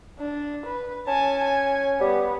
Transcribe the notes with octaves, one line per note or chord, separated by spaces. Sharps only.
D4
B4
C#4 G#5 A5
G#5
G3 B3